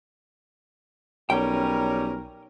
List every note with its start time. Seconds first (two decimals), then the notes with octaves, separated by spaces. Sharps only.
1.30 B1 G3 C#4 A#4 G5